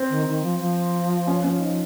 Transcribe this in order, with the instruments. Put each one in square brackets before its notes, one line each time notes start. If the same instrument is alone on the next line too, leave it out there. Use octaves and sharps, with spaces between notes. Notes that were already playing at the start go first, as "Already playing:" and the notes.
Already playing: [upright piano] C4
[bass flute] D#3
D#3
F3
F3
[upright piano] C#4
C#4
D#4